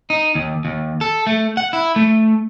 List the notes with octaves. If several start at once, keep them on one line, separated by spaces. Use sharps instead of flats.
D#4
D#2
D#2
A4
A3
F#5
E4
A3